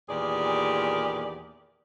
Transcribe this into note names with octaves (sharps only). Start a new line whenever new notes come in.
E2 A#2 D#3 G4 G#4 D5